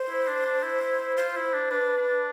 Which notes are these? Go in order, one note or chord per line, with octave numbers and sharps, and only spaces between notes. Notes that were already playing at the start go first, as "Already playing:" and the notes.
Already playing: C5
E4
D4
D4
E4
E4
E4
F4 C5
E4
D4
D4 B4
D4